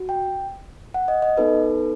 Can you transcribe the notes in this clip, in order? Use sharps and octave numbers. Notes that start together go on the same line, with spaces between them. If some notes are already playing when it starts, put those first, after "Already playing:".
Already playing: F#4
G5
F#5
D#5
D#5
B3 D#4 A4 B4